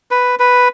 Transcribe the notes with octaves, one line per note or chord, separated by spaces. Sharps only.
B4
B4